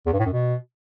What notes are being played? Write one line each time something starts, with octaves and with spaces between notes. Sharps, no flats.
E2
G2
A2
F#2
B2